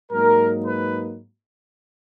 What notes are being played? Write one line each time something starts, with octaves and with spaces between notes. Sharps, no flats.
G#2 F#3 A#3 D#4 A#4
B4